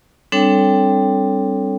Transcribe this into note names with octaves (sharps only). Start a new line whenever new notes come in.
G3 C4 D4 A4 C#5 G5